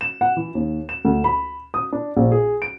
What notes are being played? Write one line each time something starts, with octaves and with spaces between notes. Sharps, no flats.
E7
F#5
E3
D#2
E7
D2
B5
D#6
D4
A#1
G#4
D7